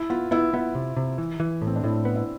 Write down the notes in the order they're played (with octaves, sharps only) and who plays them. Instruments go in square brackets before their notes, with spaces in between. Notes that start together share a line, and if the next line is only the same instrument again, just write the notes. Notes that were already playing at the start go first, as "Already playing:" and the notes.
Already playing: [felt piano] E4
[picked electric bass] B3 [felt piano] F4
[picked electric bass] B3 [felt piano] E4
[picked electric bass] B3 [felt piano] E4
[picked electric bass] C3
C3
E3
E3
A2
[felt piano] C4
D4
[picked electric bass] A2 [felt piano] E4
[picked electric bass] B3
[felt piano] E4